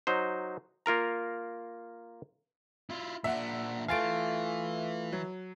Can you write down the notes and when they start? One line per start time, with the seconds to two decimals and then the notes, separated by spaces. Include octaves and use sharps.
0.07 F#3 D#4 C5
0.86 A#3 F4 A#4 A#5
2.90 E4 F4
3.24 A#2 D4 E5 F#5
3.88 E3 A3 F4 F5 G#5 A6 D7
5.13 F#3